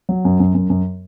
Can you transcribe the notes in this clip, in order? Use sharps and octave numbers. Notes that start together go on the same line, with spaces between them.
F#3
F#2
F#2
F#2
F#2